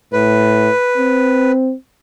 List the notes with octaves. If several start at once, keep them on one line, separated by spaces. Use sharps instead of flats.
A2 B4
C4